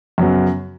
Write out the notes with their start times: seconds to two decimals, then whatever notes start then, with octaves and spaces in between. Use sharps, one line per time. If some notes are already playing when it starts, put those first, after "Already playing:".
0.18 F#2 C#3 F#3 B3 F#4